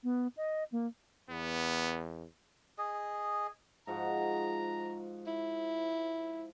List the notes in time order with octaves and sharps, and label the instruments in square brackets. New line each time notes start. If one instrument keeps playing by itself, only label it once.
[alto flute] B3
D#5
A#3
[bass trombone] E2 [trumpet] B3
[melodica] G#4 D#5
[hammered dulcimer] G#2 F3 F#4 [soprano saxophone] A#5
[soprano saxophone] E4